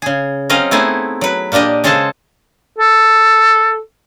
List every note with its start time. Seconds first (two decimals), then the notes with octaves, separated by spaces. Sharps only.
0.02 C#3 G#4
0.50 F#3 C4 C#4 D#5 F5
0.71 A3 B3 C4 D#4 E4 G#4
1.21 F#3 B4
1.52 A#2 A#3 D4 G4 D#5
1.84 C#3 G#3 G#4 A4 C5 A5
2.78 A4